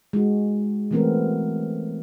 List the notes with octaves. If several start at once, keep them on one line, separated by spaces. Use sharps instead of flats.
G#3 F#4
E3 F#3 A3 B3 C4 A#4